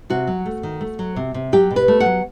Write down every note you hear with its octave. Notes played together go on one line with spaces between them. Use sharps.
C3 F#4
F#3
A3
D#3
A3
F#3
C3
C3
F#3 G4
B2
B4
A3
F#5
F#3